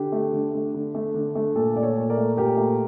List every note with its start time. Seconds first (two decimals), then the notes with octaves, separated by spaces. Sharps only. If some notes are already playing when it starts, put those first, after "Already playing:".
Already playing: D3 G4
0.12 A3
0.33 D3
0.54 A3
0.74 D3
0.95 A3
1.14 D3
1.35 A3
1.55 A#2 A4
1.75 A3 D5
1.82 A4 C#5
1.97 A#2
2.10 A#4 D5
2.17 A3
2.37 A#2 G4 A#4
2.57 A3